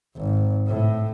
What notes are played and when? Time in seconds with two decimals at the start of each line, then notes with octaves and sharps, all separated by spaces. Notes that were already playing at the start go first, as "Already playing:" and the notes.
0.17 G#1
0.68 A2